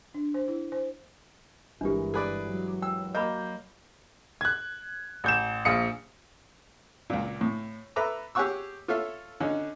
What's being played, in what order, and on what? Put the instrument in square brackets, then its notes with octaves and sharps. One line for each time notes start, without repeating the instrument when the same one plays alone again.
[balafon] D4
C5
E4
C5
[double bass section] G1 [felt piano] E3 G#3 A#4 [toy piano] D4 G4
[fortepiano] G#4 B4 D5
[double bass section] F#3
[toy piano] G5 [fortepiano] E6
[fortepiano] A#3 [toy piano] D#5 B5 [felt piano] G6
[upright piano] F#6 G#6
A1 G6 E7
A#1 F5 D#6 C#7
[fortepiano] C#2 A#2
A2
A4 B4 E5 A#5 D6
G4 G#4 C#5 F#5 C#6 E6
F4 A4 C#5 E5 F5
D3 C#4 D#4